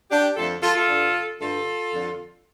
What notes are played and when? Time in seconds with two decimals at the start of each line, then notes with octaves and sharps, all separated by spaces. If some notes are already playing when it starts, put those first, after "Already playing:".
0.11 D4 G4
0.36 F2 D3 F4 A4
0.63 F4 A4
0.75 F4 A4
0.89 G2 D3
1.40 G2 D3 F4 A4
1.92 F2 D3